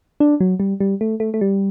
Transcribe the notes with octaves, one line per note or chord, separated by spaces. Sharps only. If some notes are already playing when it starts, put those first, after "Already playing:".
D4
F#3
G3
G3
A3
A3
A3
G3